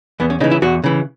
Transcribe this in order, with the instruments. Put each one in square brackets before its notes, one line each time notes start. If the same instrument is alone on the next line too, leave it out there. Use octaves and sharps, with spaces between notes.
[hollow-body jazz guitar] E2 B3
C#4
C#3 D#4
E3
E4
E2 F#4
C#3 E3